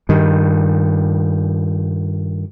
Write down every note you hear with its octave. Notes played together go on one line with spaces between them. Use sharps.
G2 D#3